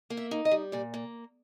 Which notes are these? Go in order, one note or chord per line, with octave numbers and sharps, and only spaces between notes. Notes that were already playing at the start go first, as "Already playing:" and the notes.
A#3
E5
D#4
D#5
G3
A#2 D5
A#3